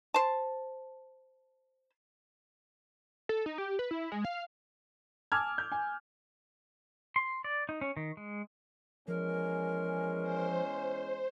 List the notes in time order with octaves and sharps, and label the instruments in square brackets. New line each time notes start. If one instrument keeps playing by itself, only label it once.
[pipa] C5 A5
[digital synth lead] A4
D#4
G4
B4
E4
G#3
F5
[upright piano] G#5 A5 D6 E6 F6 G#6
G6
G#5
[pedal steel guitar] C6
D5
D#4
C#4
D#3
G#3
[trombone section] E2 G#3 C#4 [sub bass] F3 [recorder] A#4
[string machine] C5